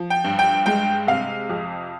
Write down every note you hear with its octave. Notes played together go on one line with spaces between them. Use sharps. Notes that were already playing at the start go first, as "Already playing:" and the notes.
Already playing: F3
G5
G2
G5
G#3 G5
C3 F5
F2